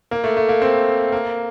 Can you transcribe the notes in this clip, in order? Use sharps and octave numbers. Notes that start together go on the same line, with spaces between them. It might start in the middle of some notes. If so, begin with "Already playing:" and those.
A#3
A3
A3
A#3
C4
A#3